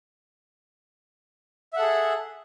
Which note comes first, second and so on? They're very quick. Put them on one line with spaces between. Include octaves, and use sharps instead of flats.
E5 F#5 A4 G#4